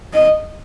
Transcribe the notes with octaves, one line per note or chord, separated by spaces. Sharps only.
D#5